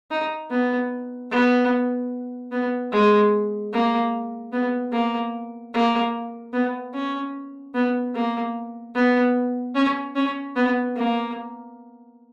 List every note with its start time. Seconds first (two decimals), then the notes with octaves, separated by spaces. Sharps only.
0.11 D#4
0.51 B3
1.31 B3
2.52 B3
2.92 G#3
3.73 A#3
4.52 B3
4.93 A#3
5.74 A#3
6.53 B3
6.94 C#4
7.74 B3
8.15 A#3
8.95 B3
9.75 C#4
10.16 C#4
10.56 B3
10.96 A#3